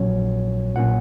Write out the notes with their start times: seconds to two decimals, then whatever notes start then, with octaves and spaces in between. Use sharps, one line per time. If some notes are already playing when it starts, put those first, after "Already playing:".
Already playing: A#1 A#2 F#3 C#4 C#5
0.75 B1 A#2 A#3 C#4 F#5